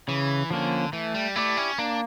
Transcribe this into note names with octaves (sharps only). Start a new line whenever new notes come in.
C#3 E3
D3 F3 A#3 C#4
E3 A3
G3
A3 E4 G4 D5
C#4
A#3 D4